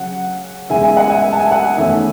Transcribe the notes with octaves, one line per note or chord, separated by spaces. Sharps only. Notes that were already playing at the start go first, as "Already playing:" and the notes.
Already playing: C#3 F#3 C#4 F#5
E2 C#3 G#3 E5 G#5
E5 G#5
D#5 F#5
E5 G#5
G#5
A5
E5 G#5
F#5 A5
E2 D#3 A3 C#4 E5 G#5